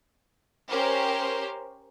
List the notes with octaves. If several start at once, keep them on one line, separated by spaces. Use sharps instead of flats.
C#4 G4 A#4 C5